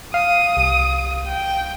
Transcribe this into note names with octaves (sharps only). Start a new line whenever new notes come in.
F5 D#6
C2
G5